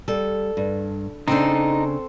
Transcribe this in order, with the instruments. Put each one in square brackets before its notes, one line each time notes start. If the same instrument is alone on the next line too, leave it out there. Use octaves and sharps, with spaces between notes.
[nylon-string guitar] G3 [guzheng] A4
[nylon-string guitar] G2
[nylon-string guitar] C#3 D4 [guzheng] C4 A4 C5 [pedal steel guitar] D#4